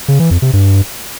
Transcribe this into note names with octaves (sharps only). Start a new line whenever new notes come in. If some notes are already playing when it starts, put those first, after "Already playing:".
C#3
E3
F2
C3
G2